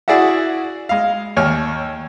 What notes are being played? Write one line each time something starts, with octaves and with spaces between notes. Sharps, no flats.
E4 F#4 G#4 D5 E5 F#5
G#3 F5
D#2 C#5 G#5 F6